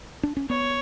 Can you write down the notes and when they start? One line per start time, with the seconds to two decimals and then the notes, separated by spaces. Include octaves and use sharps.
0.23 D4
0.37 C#4
0.49 B3 C#5